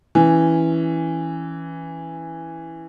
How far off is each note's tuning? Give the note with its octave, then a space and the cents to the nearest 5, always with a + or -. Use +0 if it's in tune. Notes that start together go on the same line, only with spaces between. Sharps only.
E3 +0 C#4 +0